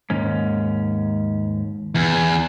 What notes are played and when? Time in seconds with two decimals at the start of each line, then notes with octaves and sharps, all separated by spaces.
0.10 D#2 G#2 C#4
1.95 E2